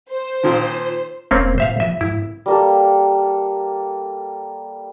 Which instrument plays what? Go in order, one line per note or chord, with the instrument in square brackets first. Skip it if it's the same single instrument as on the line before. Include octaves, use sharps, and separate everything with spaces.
[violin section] C5
[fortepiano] A#2 D#3 F3
[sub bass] E1 [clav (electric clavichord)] A#3 C4 C#4
[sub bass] A2 [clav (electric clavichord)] C5 E5 F5
[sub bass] F3 [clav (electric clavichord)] E5
[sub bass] G#2 [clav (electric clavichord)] E4
[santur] G3 A#3 A4